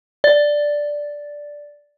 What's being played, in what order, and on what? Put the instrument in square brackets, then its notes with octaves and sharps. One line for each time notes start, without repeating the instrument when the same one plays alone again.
[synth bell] D5 A6